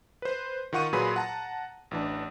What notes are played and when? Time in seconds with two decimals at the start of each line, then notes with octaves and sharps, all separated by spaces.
0.22 B4 C5
0.73 D#3 F4 F#5 C#6 D#7
0.93 A#2 F#3 G#4 B4 B5 C6
1.16 F#5 A5 A#5
1.91 A1 E3 D4